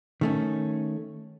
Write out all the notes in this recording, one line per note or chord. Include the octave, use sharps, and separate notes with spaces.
D#3 A3 C#4